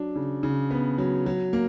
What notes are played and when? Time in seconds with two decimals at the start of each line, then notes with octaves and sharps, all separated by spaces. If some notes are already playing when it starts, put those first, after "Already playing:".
Already playing: F#3 D4
0.16 C#3
0.43 C#3
0.71 B3
0.98 F#3
1.26 F#3
1.53 A#3